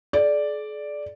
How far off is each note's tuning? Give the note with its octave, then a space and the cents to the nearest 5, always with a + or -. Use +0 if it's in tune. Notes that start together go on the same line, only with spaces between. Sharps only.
G#4 +45 D5 +0